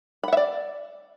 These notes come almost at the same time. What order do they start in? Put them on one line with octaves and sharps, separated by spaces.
B5 F#5 E5 D5